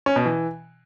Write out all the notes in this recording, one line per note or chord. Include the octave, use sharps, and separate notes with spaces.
C#4
B2
E3